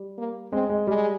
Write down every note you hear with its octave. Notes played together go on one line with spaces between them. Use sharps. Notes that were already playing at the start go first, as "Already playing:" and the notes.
Already playing: G3
A#3
G#3 C4
G#3
G3 G#3